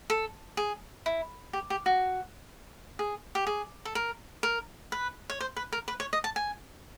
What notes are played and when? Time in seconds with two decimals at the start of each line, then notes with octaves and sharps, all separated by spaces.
0.10 A4
0.57 G#4
1.06 E4
1.53 G4
1.70 G4
1.86 F#4
2.99 G#4
3.35 G4
3.47 G#4
3.85 A4
3.95 A#4
4.43 A#4
4.92 B4
5.30 C#5
5.40 C5
5.57 B4
5.72 A#4
5.88 B4
6.00 C#5
6.13 D#5
6.24 A5
6.36 G#5